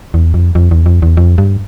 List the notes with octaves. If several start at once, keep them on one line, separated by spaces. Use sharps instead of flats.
E2
F2
F2
E2
F2
E2
F2
G2